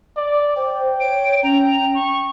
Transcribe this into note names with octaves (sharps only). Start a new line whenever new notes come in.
D5
C5 G5
C#5 D7
C#4 A#5
C#6